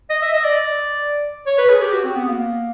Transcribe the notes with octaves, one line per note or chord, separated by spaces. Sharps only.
D#5
E5
D#5
D5
C#5
B4
G#4
G4
F#4
C4
B3
A#3